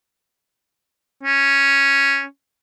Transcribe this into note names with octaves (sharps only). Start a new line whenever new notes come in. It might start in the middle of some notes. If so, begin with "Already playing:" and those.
C#4